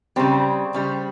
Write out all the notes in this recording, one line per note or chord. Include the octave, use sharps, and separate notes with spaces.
C#3 G3 C4
C#3 G3